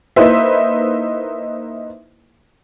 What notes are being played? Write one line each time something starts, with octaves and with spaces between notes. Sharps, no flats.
A#3 D#4 E4 B4 C5 E5